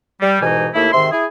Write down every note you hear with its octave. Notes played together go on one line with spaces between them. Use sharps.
G3
C2 G#2 B2 E3 D#4 G#5
D#2 A3 A#3 E4
G#2 C3 D#3 E5 C6
E4 G#4